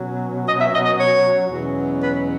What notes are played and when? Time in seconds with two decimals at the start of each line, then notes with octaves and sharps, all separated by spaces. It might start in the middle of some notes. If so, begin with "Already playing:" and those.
Already playing: B2 F#3 C#4
0.46 D#5
0.59 E5
0.72 D#5
0.84 D#5
0.98 C#5
1.49 E2 B2 F#3 C#4
2.01 B4